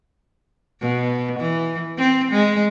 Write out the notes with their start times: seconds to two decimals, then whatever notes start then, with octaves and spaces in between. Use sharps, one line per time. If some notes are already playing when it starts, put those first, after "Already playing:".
0.81 B2
1.39 E3
1.98 C4
2.32 G#3